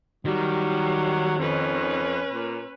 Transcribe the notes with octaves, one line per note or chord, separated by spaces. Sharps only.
D#3 F#3 G3
F2 C#4 B4
A#2